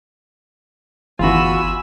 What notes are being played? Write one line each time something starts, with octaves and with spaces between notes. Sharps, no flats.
G1 E2 E3 F4 F#4 G#5 B5 E6